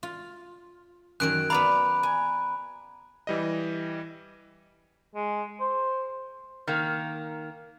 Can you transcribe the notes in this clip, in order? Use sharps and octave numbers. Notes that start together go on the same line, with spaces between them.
F4
F#2 D#3 F#3 F#6 D7
B3 D5 F5 A#5 B5
G#5
E3 G3 D#5
G#3
C5
D#3 A#3